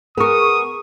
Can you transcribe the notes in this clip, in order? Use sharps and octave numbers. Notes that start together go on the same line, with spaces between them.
B3 G#4 A#4 C#6 D#6